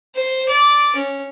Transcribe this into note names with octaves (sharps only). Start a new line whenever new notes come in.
C5
D5
C#4